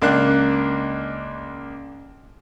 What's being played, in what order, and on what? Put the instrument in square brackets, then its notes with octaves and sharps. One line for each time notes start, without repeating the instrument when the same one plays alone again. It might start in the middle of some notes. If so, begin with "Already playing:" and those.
[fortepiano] C#2 A#3 D4 F#6